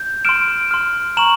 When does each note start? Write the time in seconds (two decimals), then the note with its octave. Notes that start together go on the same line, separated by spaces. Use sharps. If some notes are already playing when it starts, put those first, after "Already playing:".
Already playing: G6
0.25 C6 F6 D7 E7
0.71 C6 F6
1.17 A#5 C#6 E7 F#7